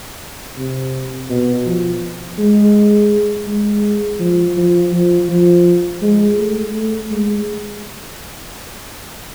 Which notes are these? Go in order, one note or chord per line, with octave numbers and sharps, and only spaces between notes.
C3
B2
F3
G#3
G#3
F3
F3
F3
F3
G#3
A3
A3
G#3